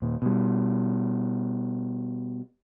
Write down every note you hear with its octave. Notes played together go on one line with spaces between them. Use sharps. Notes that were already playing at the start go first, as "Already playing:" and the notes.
D#2 A#2
B2 G3